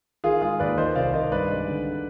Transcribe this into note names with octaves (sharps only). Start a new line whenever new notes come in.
D#3 F4 G#4
G#3 F4 G#4
D#2 B4 D5
D#3 C5 D#5
C2 D5 F5
D#3 C5 D#5
G2 B4 D5
G#3
D3